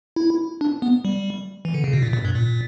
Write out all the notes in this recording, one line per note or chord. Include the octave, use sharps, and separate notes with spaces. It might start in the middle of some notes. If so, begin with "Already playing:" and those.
E4
D4
B3
G3
E3
D3
C#3
B2
A#2
A#2
G2
A#2